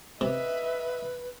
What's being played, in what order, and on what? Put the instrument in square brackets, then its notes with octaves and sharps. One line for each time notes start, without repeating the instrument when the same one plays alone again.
[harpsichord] C3 [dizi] B4 [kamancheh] D#5 E5